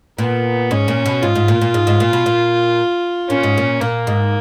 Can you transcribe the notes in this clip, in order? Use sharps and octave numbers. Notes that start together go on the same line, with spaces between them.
A#2 B3
G#2 C#4
A#2
B2
G#2 F4
G#2
A#2
A#2
G#2
G#2
A#2
B2
A#2
A#2 C#4
G#2
A#2
A#2 A#3
G#2